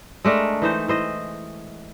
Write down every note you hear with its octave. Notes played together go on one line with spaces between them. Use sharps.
G#3 A3 D4 A#4
E3 D#4 C5
E3 C5 D#5